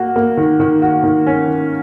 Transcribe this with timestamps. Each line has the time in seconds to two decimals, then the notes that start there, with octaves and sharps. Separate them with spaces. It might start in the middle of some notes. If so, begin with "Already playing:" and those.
Already playing: A#3 F#4
0.16 A#3
0.37 D#3
0.60 D#3
0.82 F#4
1.04 D#3
1.27 C#4
1.48 D#3